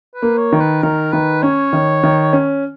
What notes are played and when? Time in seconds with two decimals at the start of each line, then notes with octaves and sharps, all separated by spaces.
0.15 B4
0.22 A#3
0.38 C#5
0.53 D#3
0.60 B4
0.83 D#3 A#4
1.12 D#3 B4
1.43 C#4 C#5
1.73 D#3
2.04 D#3
2.33 C#4